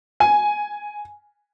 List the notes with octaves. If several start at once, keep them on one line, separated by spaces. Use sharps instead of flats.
G#5